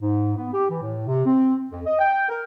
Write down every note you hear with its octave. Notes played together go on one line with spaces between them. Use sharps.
G#2
B3
G4
E3
A2
C3
C4
F2
D#5
G5
A#4